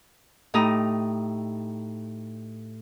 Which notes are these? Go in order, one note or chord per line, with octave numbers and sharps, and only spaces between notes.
A2 D#4 G4 A#5 D#6